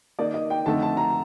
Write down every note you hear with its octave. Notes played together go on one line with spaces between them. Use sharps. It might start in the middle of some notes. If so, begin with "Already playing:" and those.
D#3 A#3 D#4 D5
D#5
G5
F2 D3 A3 D#4 A5
A5
A#5